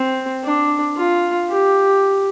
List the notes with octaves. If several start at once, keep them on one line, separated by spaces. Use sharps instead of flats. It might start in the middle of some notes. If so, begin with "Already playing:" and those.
Already playing: C4
D4
F4
G4